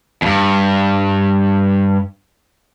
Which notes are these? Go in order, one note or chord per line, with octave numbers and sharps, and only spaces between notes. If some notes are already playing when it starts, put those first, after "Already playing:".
E2 G2